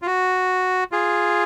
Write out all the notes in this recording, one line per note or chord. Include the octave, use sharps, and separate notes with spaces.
F4
F#4
F4 G#4